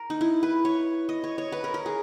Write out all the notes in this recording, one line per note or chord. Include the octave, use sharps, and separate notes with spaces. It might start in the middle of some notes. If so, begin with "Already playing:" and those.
Already playing: A#4
D#4
E4
B4
C#5
D#5
C#5
C#5
B4
A#4
A#4
G#4